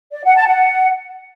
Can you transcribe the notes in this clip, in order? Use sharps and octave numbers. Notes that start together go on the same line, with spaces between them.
D5
F#5
A5
F#5